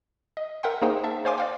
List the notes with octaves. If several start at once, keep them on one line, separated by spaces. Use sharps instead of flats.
D#5
A#4 E5 F#5 G5 C6
A#3 D#4 G#4 C5 F#5 G5
E5 A5
C5 C#5 F5 G#5 C6 D6
D5 F5 G5